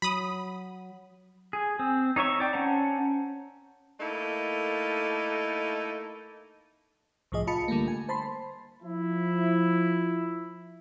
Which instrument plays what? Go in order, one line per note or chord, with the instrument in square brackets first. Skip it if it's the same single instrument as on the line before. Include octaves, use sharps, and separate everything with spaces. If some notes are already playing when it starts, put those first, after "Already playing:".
[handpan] F#3 [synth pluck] B5 D#6
[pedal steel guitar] G#4
C4
D#4 C#5 E5 C#6
D5 G5
C#4 C5 F#5 A5 A#5
[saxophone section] A3 A#3 D#4 E4 A4
[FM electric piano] C2 A2 F3 G#4 D#5
F4 D#5 A5 B5 C#7
D3 G3 A3 A#3
G#5
C5 A5 B5 C6
[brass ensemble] F3 E4